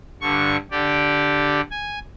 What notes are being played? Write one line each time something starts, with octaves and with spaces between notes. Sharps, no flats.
G2 D3 C#6
D3 G4 D5
G#5